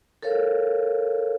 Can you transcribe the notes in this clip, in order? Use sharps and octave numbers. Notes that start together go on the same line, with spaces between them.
A4 A#4 C#5 F5